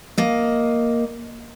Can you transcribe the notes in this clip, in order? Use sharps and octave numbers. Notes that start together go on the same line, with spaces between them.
A#3 D#5